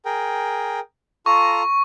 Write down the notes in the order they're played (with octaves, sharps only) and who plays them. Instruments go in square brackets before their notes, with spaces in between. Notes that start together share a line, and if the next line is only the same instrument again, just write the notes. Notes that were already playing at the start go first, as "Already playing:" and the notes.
[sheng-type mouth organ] G#4 A#4 G5
[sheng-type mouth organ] F4 A4 A#5 [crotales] C#6